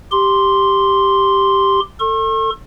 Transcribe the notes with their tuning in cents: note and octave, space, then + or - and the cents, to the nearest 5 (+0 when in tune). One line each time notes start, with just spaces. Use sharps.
G4 +0 C6 +0
A4 +25 C#6 -45